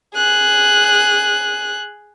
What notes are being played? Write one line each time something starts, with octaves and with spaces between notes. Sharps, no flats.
G#4 F#6